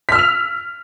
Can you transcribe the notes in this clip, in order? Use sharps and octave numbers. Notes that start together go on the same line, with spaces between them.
E6 F6 B6 F7